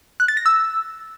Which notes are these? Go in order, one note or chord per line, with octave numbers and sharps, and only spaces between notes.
F#6
A6
A#6
E6